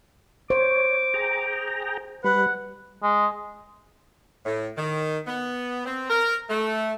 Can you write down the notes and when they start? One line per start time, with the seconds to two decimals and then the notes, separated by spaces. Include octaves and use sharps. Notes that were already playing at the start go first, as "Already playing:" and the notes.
0.50 C5 C#5 D6
1.14 G#4 G5 A#5
2.24 G3 B4 F#5
3.03 G#3
4.46 A2
4.77 D#3
5.27 B3
5.85 C4
6.10 A#4
6.50 A3